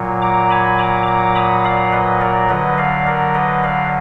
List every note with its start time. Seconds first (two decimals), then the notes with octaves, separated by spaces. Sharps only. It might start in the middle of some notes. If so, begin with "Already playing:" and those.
Already playing: A#2 F#3
0.22 A#5 D6
0.50 G#5 B5
0.79 A#5 D6
1.07 A#5 D6
1.35 B5 D#6
1.64 D5 F5
1.92 B4 D#5
2.21 A#4 D5
2.49 D3 F#3 B4 D#5
2.78 D5 F5
3.07 A#4 D5
3.34 B4 D#5
3.63 D5 F5